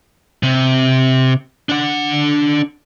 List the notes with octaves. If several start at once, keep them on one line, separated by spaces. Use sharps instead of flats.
C3
D4 F#5